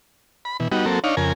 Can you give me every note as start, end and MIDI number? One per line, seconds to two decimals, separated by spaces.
0.45 0.57 83
0.60 0.68 47
0.60 0.68 52
0.72 0.85 55
0.72 0.85 59
0.72 0.85 63
0.72 0.85 66
0.86 0.99 54
0.86 0.99 58
0.86 0.99 60
0.86 0.99 69
1.04 1.15 62
1.04 1.15 63
1.04 1.15 73
1.04 1.15 77
1.17 1.32 41
1.17 1.32 49
1.17 1.32 70
1.17 1.32 80